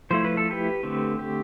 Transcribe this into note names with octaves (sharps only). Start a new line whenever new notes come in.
F3 A3 E4 C5
B4
A4
G4 B4
D3 A3 C4
G4